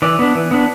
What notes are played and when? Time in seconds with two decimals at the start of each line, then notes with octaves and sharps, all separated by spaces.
0.02 E3 D5
0.19 B3 D4
0.35 E3
0.51 B3 D4